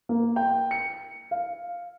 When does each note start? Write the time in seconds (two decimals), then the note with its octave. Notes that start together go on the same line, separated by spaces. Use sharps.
0.09 A#3
0.36 G5
0.71 C#7
1.31 F5